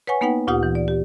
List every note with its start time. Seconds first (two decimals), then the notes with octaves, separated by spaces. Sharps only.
0.07 B4 C#5 F#5 G#5 C#6
0.21 A#3 B3 D#4 B4 F#5 G5
0.47 D2 A#2 F4 G4 F#5 D#6
0.63 E3
0.75 D5
0.88 G4